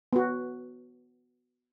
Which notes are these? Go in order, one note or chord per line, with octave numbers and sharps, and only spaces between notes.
B3 F#4